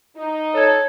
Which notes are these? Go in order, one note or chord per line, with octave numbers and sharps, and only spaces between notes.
D#4
A4 C#5 G#6